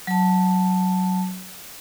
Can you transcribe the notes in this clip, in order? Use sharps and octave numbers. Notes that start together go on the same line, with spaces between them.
F#3 A5